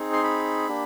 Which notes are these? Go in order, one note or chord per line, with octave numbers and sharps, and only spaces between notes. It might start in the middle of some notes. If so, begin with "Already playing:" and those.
Already playing: C4 D#4 G#4
C6
B5
A#3 D4 G4